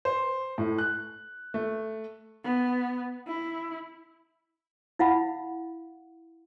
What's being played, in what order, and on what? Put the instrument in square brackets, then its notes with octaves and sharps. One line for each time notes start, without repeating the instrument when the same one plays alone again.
[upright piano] C5
A2
F#6
A3
[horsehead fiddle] B3
E4
[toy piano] E4 F5 F#5 B5